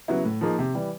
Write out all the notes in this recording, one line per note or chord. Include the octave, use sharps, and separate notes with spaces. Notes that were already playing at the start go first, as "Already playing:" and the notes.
C#3 F#3 B3 E4
A2
F3 A#3 D#4 G#4
C3
E3 G3